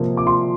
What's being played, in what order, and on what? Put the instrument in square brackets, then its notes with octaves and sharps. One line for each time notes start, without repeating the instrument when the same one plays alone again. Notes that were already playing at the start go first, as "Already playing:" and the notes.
Already playing: [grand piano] F2 C3 A#3 F4
D6
C6